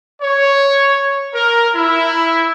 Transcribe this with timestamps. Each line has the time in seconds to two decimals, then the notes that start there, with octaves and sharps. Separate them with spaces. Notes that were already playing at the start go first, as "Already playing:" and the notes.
0.22 C#5
1.35 A#4
1.75 E4